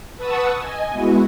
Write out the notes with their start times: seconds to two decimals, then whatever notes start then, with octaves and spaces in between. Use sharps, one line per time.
0.17 B4 F#5 A5 C#6 D#6 E6
0.57 D#5 G#5
0.92 G#3 B3 E4 F#4